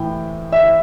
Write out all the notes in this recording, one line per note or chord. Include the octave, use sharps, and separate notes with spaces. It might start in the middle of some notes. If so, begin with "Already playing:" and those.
Already playing: A2 E3 G5
E5